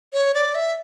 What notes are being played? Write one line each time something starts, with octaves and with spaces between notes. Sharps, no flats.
C#5
D5
E5